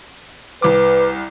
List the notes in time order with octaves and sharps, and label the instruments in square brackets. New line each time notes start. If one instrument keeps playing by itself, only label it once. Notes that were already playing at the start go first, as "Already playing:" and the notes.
[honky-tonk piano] C2 D6 [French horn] B4